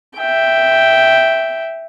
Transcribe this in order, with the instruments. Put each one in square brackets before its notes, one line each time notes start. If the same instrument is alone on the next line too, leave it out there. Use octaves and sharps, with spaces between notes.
[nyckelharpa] E5 G5